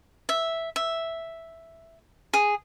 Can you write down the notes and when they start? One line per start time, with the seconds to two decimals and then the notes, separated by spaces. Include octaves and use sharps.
0.29 E5
0.76 E5
2.33 G#4